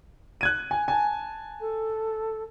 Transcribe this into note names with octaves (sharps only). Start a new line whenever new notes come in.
F#6 G#6 D#7
G#5
G#5 A5
A4